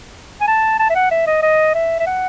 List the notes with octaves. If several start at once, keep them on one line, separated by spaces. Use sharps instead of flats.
G#5
A5
A5
E5
F#5
E5
D#5
D#5
E5
E5
F#5